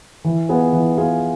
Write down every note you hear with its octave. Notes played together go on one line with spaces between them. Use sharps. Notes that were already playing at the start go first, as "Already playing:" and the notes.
E3
B3 F4 G#4
E3
B3 F4 G#4